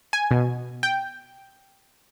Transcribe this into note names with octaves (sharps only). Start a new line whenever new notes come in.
G#5
B2
G5